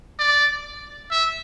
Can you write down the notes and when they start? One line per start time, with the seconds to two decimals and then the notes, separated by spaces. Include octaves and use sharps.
0.19 D5
1.11 E5